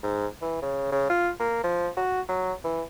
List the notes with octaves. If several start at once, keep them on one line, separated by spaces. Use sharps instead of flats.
G#2
E3
C#3
C#3
F4
A#3
F3
F#4
F#3
E3